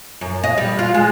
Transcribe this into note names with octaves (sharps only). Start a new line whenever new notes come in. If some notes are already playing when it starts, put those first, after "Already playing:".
F#2
D#5
G3
F4
G#3